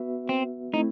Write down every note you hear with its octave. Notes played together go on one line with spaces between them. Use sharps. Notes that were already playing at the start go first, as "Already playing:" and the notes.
Already playing: B3 F#4 B4 E5
C4
A3 C4 D#4 E4